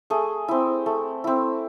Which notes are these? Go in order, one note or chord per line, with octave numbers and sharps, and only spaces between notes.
A3 G#4
C4 E4
A3
C4 E4